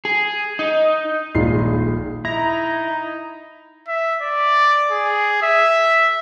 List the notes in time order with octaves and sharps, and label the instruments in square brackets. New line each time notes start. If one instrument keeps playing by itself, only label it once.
[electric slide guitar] G#4
D#4
[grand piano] D#1 A#1 A#2 G#3 D#4 C7
[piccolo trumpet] D#4 [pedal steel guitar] E4 [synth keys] A#5
[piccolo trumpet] E5
D5
G#4
E5